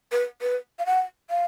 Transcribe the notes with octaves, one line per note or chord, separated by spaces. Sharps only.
B4
B4
F5
F#5
F5